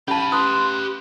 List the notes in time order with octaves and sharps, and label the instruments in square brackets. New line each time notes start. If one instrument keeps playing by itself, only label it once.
[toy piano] C#4 A5 [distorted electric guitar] G4 F5 [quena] B5
[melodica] B4 [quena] C6 [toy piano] D#6